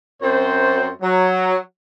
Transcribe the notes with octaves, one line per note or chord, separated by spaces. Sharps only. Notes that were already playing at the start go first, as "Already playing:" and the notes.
F#2 C4 C5
F#3